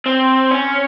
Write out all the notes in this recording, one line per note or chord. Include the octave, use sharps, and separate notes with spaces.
C4
C#4